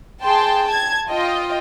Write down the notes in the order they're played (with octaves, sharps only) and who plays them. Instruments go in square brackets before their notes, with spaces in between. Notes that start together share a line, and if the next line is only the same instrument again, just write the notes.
[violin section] G#4 G5 A5 C6
A5 G#6
F4 D#5 G5